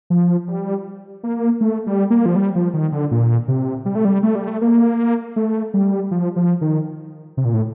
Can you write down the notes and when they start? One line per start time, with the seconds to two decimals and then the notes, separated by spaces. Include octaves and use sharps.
0.10 F3
0.48 G3
1.24 A#3
1.61 A3
1.87 G3
2.10 A#3
2.26 F3
2.36 G3
2.55 F3
2.74 D#3
2.92 D3
3.11 A#2
3.48 C3
3.86 G3
3.95 A3
4.05 G3
4.23 A3
4.35 G3
4.48 A3
4.61 A#3
5.36 A3
5.74 G3
6.11 F3
6.36 F3
6.61 D#3
7.37 C3
7.45 A#2
7.54 A2